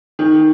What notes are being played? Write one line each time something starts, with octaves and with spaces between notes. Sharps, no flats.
D#3